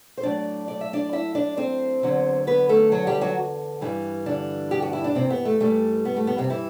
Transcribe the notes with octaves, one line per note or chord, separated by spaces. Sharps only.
C5
A2 F#3 D4 D5
D5
E5
D4 D5
E4 E5
D4 D5
C4 C5
E2 D3 F#3
B3 B4
A3 A4
F#3 F#4
G3 G4
F#3 F#4
G2 E3 G3
D3 D4
G4
F#4
E4
D4
C3 C4
B3
A3
G2 E3 G3 A3
B3
A3
B3
C3 C4
E3 E4